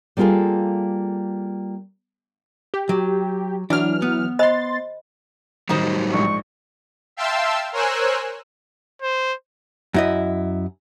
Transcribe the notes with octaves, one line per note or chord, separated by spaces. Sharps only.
G3 A#3 B3 F4 G#4 A4
G4
F#3
E3 F#3 D4 F6
B3
C5 D#5 B5 C6 A6
A2 D#3 F#3 G3 D#4 C5
A#1 G#2 C#6
E5 F5 G5 A5 C6 E6
A#4 C5 C#5 G#5 E6 F#6
C5
F#2 E4 D#5